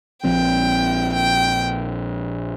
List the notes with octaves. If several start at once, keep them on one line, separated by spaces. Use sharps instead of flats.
A#1 A#2 F3 C4 G5
G5